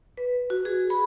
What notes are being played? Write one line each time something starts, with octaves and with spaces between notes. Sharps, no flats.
B4
F#4
G#4
B5